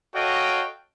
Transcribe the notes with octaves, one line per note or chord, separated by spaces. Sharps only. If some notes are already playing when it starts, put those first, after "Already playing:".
F#4 A4 C#5 D#5 F5 G5